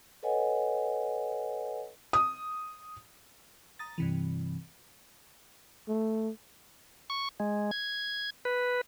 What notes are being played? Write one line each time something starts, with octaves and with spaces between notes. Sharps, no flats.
A4 B4 C#5 D#5 F#5 G#5
D#6
A#5 D#6 A6
G2 C3 E3
A3
C#6
G#3
G#6
B4